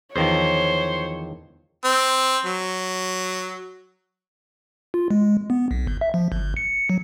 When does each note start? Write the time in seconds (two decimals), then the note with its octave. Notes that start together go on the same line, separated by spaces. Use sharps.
0.16 E2 D#3 F3 C5 C#5
1.85 C4
2.46 F#3
4.94 F4
5.11 G#3
5.50 B3
5.71 B1
5.87 G1
6.01 E5
6.14 F3
6.32 G1
6.57 C#7
6.90 F#3